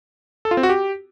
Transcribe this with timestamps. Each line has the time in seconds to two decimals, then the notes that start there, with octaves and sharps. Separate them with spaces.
0.45 A4
0.51 F4
0.57 C4
0.63 F#4
0.69 G4